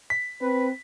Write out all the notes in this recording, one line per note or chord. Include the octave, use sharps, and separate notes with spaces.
B6
C4 B4